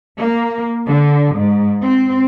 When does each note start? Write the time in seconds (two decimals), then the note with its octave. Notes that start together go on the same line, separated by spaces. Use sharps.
0.17 A#3
0.87 D3
1.36 G#2
1.83 C4